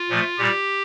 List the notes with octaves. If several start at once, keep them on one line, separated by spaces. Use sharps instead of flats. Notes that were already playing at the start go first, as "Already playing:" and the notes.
Already playing: F4
A#2 F3 A3
A#2 G3 G4